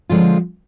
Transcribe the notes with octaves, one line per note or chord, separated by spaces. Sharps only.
D3 F3 G#3 C4 F4